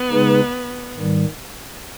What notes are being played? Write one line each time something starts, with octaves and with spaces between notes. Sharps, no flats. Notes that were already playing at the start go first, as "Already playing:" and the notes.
Already playing: B3
C#3 G#3 D#4 G#4 B4
G#2 D#3 G3